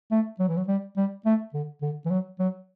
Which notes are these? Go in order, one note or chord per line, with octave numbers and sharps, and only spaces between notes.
A3
F#3
E3
F#3
G3
G3
A3
D3
D3
E3
F#3
F#3